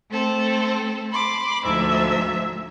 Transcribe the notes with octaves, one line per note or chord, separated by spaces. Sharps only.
A3 C4 A4
B5 C6 D6
D2 G#2 F3 E5